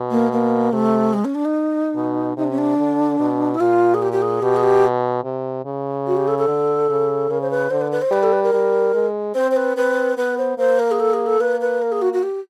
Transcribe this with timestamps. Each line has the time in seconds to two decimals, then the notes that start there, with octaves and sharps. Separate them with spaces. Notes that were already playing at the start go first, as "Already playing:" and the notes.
Already playing: B2
0.10 A#3
0.32 A#3
0.72 C3 A3
1.13 G#3
1.24 C#4
1.34 D4
1.45 D#4
1.96 B2
2.37 C3 D#4
2.43 D4
2.51 C#4
2.58 D4
2.78 D3
3.20 B2
3.54 E4
3.60 A#2 F4
3.94 G#4
4.02 G4
4.12 G4
4.22 G#4
4.42 B2 G4
4.56 G#4
4.63 G4
5.24 C3
5.65 C#3
6.07 F#4
6.16 G4
6.27 A4
6.38 A4
6.48 D3
6.89 C#3
7.29 C#3 A#4
7.41 C5
7.50 B4
7.70 D3 C5
7.81 B4
7.91 B4
8.01 C5
8.11 G3 B4
8.23 A4
8.32 B4
8.43 A#4
8.53 G3
8.94 G#3
9.34 C4 C5
9.51 C5
9.56 B4
9.76 C4 B4
10.17 B3 B4
10.38 C5
10.58 A#3 C5
10.79 A#4
10.91 G#4
11.00 A4
11.13 G#4
11.26 A4
11.40 A#3 B4
11.60 B4
11.81 A#4
11.92 G#4
12.01 F#4
12.13 F#4
12.23 G4